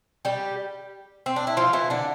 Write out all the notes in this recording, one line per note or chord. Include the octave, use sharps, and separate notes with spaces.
G3 G4
C4
D4
E4
F3 F4
E3 E4
D3 D4